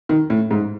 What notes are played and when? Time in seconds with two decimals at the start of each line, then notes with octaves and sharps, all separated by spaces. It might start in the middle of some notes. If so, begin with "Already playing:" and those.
0.09 D#3
0.30 A2
0.51 G#2